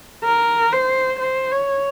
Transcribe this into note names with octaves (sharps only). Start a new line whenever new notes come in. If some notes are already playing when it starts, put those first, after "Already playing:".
A#4
C5
C5
C#5